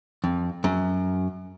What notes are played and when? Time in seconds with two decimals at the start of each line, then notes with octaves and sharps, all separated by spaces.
0.24 F2
0.64 F#2